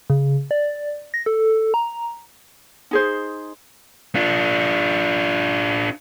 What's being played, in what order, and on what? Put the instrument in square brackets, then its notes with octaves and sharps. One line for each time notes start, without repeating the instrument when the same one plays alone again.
[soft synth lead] C#3
D5
A#6
A4
A#5
[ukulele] D#4 G#4 C5
[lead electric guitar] D4 F4